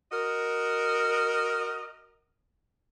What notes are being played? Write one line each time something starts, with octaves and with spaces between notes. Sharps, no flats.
F#4 A#4 D#5